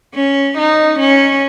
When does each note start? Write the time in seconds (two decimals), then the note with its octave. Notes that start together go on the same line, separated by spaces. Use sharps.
0.15 C#4
0.58 D#4
0.99 C#4